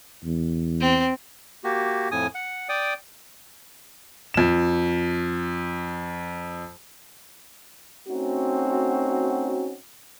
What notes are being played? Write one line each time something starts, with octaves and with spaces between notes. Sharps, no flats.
E2
C4
A#3 F#4 G4
F2 A2 G#5 D#6
F#5
D5 G5 D#6
F2 E7
A3 C4 C#4 D#4 F#4